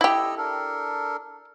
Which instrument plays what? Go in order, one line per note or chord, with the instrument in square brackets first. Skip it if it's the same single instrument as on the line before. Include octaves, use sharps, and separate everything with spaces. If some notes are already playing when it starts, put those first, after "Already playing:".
[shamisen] E4 G4 [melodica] A4 D#5 E6
[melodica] D4 A4 A#4